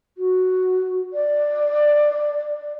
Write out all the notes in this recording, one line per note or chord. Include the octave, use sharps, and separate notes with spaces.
F#4
D5